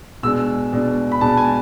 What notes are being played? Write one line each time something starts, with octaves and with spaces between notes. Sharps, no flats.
B2 G#3 D4 E6
B2 G#3 D4
B5
B2 G#3 D4 A5
G#5